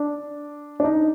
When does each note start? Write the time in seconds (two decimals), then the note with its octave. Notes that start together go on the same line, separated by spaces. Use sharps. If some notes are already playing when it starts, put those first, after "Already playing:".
Already playing: D4
0.80 D4
0.84 D#4